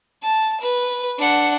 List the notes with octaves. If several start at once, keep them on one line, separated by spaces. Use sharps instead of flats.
A5
B4
D4 F#5